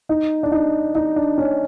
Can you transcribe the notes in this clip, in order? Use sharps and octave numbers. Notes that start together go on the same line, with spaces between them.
D#4
D4
D#4
D#4
D4
C#4